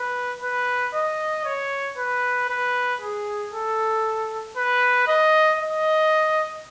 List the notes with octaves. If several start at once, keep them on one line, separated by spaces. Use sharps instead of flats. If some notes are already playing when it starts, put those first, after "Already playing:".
Already playing: B4
B4
D#5
C#5
B4
B4
G#4
A4
B4
D#5
D#5